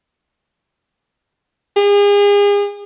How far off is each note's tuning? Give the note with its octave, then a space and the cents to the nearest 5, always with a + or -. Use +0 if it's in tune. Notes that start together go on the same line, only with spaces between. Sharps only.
G#4 -35